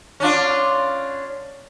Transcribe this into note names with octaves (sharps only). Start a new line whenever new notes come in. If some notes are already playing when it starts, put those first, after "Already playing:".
C#4 D4 F4